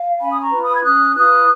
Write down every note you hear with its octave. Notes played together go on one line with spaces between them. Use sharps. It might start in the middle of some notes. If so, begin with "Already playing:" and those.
Already playing: F5
C#4 G#5 B5
D#6
A#5 C#6
F4 B4
B5 D#6
G#6
C#4 D#6 F#6
F4 B4 D#6 F#6